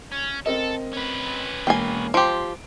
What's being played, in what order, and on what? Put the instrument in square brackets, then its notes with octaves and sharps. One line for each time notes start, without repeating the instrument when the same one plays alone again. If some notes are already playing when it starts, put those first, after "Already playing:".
[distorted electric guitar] C#4
[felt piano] C4 A#4 D#5 [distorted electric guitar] A4
[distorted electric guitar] C#4 B4
[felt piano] E1 A#3 C7 [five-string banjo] G5 G#5
[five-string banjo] F3 G4 [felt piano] C6 D7